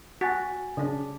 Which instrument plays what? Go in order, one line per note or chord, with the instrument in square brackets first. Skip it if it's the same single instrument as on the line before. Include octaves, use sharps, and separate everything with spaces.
[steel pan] F#4 [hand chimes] G#5 A6 B6
[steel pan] C#3 D4